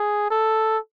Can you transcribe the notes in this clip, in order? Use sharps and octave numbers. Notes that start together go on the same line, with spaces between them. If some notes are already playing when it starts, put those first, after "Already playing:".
Already playing: G#4
A4